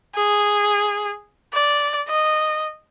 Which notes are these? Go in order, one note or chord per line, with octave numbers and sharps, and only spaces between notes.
G#4
D5
D#5